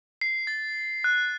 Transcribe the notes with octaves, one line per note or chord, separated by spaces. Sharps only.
C7
A6
F#6